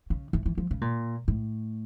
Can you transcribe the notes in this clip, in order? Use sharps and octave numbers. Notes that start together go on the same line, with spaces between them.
C#3
E3
E3
F3
C#3
A#2
A2